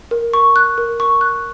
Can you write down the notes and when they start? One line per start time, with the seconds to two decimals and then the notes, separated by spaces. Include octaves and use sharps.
0.11 A#4
0.33 C#6
0.56 F#6
0.78 A#4
1.00 C#6
1.21 F#6